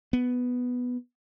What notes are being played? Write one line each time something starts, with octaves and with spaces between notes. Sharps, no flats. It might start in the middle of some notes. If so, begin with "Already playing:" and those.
B3